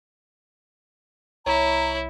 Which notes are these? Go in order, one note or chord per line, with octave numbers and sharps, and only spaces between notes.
C2 E4 C#5 A#5